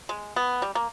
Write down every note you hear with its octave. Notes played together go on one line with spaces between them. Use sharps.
G#3
B3
G3
A#3